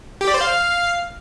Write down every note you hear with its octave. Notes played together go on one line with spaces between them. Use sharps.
G4
D5
C5
F5